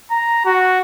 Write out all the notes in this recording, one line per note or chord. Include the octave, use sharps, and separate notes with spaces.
A#5
F#4